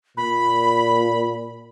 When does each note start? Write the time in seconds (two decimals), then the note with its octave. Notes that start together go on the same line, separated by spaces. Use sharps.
0.17 A#2 B5